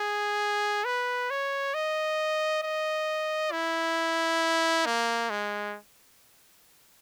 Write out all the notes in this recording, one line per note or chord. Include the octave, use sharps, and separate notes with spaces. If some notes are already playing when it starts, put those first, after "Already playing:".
Already playing: G#4
B4
C#5
D#5
D#5
E4
A#3
G#3